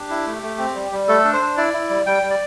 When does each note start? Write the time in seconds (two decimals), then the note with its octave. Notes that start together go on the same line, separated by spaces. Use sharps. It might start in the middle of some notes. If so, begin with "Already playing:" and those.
Already playing: D4 G4
0.10 E4
0.27 A3
0.43 A3
0.58 C4
0.75 G3
0.92 G3
1.08 A3 A4
1.25 D4
1.33 C5
1.41 D4
1.57 E4 D5
1.74 E4
1.90 G3
2.06 G3 G5
2.23 G3
2.30 D5